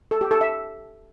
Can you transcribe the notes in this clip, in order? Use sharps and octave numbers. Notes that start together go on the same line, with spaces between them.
A4
G4
A4
E5